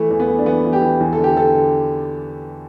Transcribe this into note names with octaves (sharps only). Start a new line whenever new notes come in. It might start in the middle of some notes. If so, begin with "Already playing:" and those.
Already playing: E3 A3
E2
B3
E3
D4
E3 B3
E3
G4
E3
E2
A4
D3
G4
D3 A4
D3